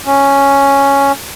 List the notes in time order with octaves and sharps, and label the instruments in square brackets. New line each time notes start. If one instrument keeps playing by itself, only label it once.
[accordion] C#4